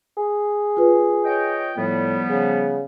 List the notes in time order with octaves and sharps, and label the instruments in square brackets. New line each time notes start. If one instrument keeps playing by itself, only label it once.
[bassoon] G#4
[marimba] F4 B4
[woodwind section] C#5 D#5 G5
[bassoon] A2 [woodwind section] F3 G3 B3
[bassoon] C#3